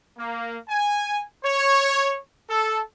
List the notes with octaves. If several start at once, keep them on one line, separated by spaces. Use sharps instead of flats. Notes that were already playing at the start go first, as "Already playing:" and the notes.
A#3
G#5
C#5
A4